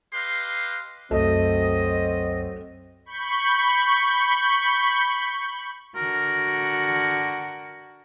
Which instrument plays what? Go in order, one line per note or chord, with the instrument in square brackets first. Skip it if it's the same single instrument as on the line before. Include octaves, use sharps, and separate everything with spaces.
[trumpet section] G4 B4 D#5 F5 C6
[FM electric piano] C2 F#2 [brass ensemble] F#3 C4 [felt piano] A3 [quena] D#5
[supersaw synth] B5 C#6 G6
[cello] D3 F#4 [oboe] A#4